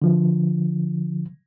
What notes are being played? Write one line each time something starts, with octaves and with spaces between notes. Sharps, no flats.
D3 F3